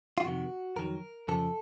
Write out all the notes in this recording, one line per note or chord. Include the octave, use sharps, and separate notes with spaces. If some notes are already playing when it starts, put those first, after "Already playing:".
F4
F2 C3 D#3 F#4
F2 D#3 F#3 A#4
F2 C#3 F3 A4